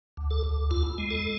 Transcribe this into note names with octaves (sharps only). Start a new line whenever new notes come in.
D2
A4
D2
E2 F4
G#3
A4